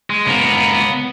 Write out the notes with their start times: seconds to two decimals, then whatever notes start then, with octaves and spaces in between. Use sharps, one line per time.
0.10 G#3
0.27 C#2 A#3 B3